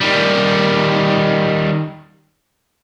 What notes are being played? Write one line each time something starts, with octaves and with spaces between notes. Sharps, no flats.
D#3 G3